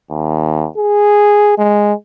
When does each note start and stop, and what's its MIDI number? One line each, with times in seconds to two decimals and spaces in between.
0.11 0.67 39
0.78 1.55 68
1.58 1.93 56